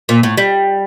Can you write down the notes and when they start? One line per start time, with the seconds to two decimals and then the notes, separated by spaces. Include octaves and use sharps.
0.09 A#2
0.23 A2
0.37 G3